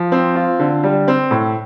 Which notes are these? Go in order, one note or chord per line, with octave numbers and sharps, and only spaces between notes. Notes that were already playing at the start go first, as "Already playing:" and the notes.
Already playing: F3
C4
F4
D3
G3
C4
A2